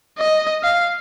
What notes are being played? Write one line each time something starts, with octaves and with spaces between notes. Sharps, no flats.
D#5
F5